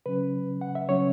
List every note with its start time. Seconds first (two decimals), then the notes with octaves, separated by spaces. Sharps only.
0.06 C#3 F#3 C#4 B4
0.61 F#5
0.75 E5
0.89 C#3 F#3 C#4 C#5